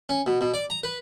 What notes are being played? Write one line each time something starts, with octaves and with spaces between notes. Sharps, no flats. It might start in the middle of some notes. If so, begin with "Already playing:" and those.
C#4
B2
B2
D5
A#5
B4